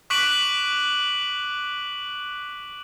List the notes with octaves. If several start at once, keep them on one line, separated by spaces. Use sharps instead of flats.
C#6 D6 F#6 B6 D7 F#7